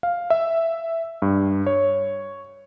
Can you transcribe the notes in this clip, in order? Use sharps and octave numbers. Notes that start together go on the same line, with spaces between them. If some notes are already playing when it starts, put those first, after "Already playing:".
F5
E5
G2
C#5